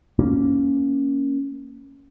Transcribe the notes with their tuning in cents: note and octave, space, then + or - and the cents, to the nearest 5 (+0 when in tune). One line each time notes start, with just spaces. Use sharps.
A#3 +0 C#4 +0